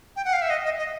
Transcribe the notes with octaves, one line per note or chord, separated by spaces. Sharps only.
G5
F#5
F5
E5
D#5
D#5
D#5